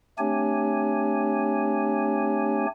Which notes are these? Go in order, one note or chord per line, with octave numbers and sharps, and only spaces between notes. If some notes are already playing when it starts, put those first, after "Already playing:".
A3 C4 D4 G4 C#5 G#5